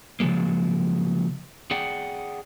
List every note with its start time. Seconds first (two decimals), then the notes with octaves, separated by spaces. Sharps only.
0.20 C#3 F3 F#3 G#3 A#3
1.71 G#4 D5 F#5 G5